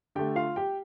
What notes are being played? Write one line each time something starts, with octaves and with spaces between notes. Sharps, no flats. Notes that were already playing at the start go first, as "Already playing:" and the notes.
D3 A3 G4 G5
F4 F5
G4 G5